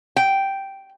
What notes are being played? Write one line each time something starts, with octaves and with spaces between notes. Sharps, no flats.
G5